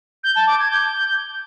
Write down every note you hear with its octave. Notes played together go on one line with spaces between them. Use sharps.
G6
A5
D6
G#6
G6